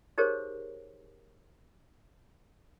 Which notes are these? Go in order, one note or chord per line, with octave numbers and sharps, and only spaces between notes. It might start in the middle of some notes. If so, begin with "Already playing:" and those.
D#4 G4 G#4 A#4 C5 C#5